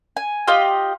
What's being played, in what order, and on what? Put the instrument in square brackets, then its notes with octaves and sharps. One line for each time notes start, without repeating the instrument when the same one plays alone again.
[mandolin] G#5
F4 G4 D#5